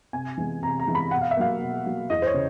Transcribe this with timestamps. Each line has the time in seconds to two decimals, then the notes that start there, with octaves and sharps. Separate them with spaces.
0.13 C3 G#5
0.38 E3 G#3 B3
0.62 C3 A#5
0.80 A#5
0.87 E3 G#3 B3
0.95 B5
1.11 B2 F#5
1.21 F5
1.31 E5
1.37 F#3 A#3 F5
1.61 B2
1.86 F#3 A#3
2.10 E2 D#5
2.22 C5
2.26 C#5
2.34 C#3